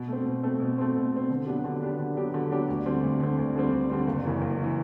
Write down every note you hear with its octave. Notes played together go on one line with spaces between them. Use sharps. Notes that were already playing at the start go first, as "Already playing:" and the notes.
Already playing: B2
A3 C4
B2
A3 C4
B2
A3 C4
B2
A3 C4
D3
F#3 B3 D4 G4
D3
F#3 B3 D4 G4
D3
F#3 B3 D4 G4
D3
F#3 B3 D4 G4
D2
D3 G3 C4
D2
D3 G3 C4
D2
D3 G3 C4
D2
D3 G3 C4
F#1
F#2 E3
F#1
E3